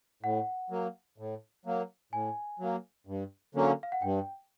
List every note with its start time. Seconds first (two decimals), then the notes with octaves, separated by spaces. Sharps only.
0.23 A2 F#5
0.70 F#3 A#3
1.18 A2
1.66 F#3 A#3
2.13 A2 G#5
2.59 F#3 A#3
3.07 G2
3.55 D3 F#3 A#3 C#4
3.83 F5
3.92 F#5
4.02 G2 G5